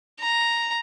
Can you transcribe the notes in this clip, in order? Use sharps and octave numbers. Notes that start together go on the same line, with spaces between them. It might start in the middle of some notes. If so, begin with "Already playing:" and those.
A#5